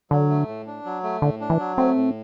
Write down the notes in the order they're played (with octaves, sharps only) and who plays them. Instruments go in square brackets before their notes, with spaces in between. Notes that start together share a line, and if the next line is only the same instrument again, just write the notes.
[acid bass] D3 [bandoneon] F#3
[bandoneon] A3
A2
D4
F#3
A3
[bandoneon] A2 [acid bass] D3
[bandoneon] D4
[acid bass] E3
[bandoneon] F#3
[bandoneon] A3 [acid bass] C4
[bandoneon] A2